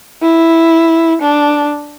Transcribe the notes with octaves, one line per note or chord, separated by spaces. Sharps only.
E4
D4